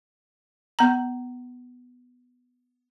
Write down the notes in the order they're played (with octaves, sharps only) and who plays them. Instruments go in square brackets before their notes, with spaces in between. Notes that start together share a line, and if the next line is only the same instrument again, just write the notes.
[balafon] B3 A#5